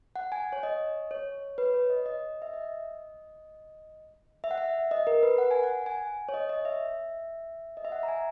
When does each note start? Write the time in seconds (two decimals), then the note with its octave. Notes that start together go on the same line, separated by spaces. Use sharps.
0.16 F#5
0.32 G#5
0.52 C#5
0.63 D#5
1.11 C#5
1.58 B4
1.74 C#5
1.90 D#5
2.06 D#5
2.42 E5
2.53 D#5
4.44 E5
4.51 F#5
4.58 E5
4.91 D#5
5.07 A#4
5.23 B4
5.38 F#5
5.51 G#5
5.64 F#5
5.86 G#5
6.29 C#5
6.34 D#5
6.49 D#5
6.65 E5
7.77 D#5
7.85 E5
7.92 F#5
8.03 A#5
8.08 G#5